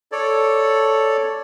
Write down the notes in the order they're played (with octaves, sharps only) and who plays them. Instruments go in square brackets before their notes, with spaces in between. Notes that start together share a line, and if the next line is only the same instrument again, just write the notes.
[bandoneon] A4 C#5 D5